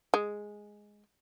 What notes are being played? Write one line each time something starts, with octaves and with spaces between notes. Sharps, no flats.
G#3